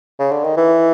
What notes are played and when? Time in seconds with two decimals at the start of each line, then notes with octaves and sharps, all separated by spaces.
0.19 C#3
0.31 D3
0.44 D#3
0.57 E3